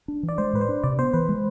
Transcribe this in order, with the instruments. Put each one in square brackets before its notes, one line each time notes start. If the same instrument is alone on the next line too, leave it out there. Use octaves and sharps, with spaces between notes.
[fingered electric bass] D4
E3
[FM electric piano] D5
[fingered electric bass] G#3 [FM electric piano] C5
[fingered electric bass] A2 [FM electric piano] B4
[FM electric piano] C5
[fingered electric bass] D4
[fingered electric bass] C3 [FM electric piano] D5
[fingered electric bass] B3 [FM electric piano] C5
[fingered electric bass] E3 [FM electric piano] B4
[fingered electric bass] G#3